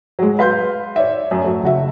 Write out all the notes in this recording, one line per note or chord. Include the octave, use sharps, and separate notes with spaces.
F#3 G#3
B4 F5 C6 G6
C#5 D5 E5
F#2
F#3 A3
F#1 F#4 E5